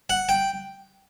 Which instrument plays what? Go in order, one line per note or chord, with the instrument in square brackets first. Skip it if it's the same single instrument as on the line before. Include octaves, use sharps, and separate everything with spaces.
[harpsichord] F#5
G5